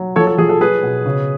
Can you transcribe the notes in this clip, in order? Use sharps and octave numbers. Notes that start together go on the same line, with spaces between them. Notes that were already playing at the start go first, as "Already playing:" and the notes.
Already playing: F#3
F3 A4 C#5
A4
F3 G#4
A4
F#3 G#4 B4
B2
C#3